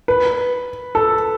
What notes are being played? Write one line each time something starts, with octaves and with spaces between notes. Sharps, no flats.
B4
A4